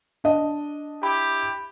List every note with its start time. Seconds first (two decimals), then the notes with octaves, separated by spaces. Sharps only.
0.24 D4 D#5
1.03 E4 G4 B5